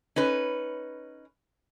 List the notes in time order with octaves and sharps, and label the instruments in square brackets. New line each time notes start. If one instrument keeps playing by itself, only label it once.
[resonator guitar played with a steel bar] C#4 D#4 B4